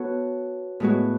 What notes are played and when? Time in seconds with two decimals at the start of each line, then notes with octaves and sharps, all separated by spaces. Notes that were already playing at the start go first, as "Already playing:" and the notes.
Already playing: B3 F#4 A4 C#5
0.80 A2 G#3 B3 F#4